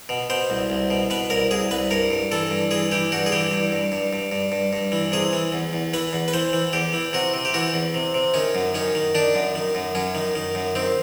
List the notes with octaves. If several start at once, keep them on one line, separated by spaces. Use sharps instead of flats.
B2
B2 C5
C2
C2
B2
B2 B4
C2 A#4
C2 G#4
C2 B4
G2 A#4
G2
E3 A4
G2
E3 G#4
E3 G4
G2 F#4
G#4
E3 G4
G2
G2
G2
G2
G2
G2
G2
E3
C3 G#4
E3
E2
E2
E3 B4
E2
B4
E3 C5
E3
E2 G4
E3
C3 F#4
C3
G4
E3 F#4
E2
C3
C3
D#3 C#4
F#2
D#3 C#4
D#3
D#3 D4
F#2
D#3
F#2
F#2 C#4
D#3
D#3
F#2
D#3 C4